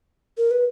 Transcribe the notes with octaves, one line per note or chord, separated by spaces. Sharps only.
A#4
B4